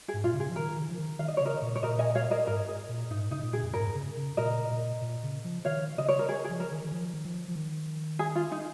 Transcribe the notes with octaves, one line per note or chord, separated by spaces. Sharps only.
G#4
G#2
A#2 F4
C#3
G#4
F3
D#3 A#4
D#3
F3
D#3
D#3 F5
D#5
C#3 C#5
A#4 D#5
A#2
C#5
A#2 A#4 D#5
D#5 G#5
C#5 F5
A#4 D#5
G#2 A#4
G#4
A#2
G#2 D#4
C#3 D#4
A#2
G#4
F2
G#2 A#4
C#3
C#3
A#2 A#4 D#5
A#2
A#2
C#3
F3
D#3 C#5 F5
C#3 D#5
C#5
A#4
G#4
G#4
F3
A#4
D#3
D#3
F3
D#3
F3
F3
D#3
G#4
F4
D#4